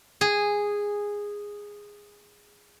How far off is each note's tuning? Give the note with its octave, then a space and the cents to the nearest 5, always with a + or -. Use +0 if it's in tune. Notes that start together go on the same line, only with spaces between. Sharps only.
G#4 -10